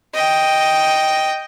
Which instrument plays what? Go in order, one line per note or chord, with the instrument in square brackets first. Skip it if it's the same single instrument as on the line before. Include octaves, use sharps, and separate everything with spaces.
[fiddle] D#5 G5